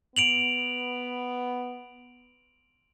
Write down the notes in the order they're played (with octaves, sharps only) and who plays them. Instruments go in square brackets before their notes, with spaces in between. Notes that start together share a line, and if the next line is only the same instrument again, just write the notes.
[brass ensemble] B3 [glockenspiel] D7 F7 F#7